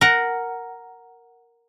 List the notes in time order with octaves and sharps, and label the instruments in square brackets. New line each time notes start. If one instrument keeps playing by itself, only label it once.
[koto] A#4 F#5